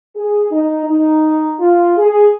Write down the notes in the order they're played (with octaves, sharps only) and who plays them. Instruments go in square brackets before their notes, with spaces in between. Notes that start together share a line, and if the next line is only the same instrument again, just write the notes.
[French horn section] G#4
D#4
D#4
F4
G#4